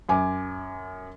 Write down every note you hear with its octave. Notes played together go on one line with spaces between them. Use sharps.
F#2 G#5 D6